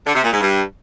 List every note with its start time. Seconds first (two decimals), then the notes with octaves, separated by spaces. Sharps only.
0.05 D3
0.14 C3
0.23 A#2
0.32 G#2
0.41 G2